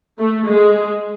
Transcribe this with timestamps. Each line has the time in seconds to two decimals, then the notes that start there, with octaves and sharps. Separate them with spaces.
0.19 A3
0.47 G#3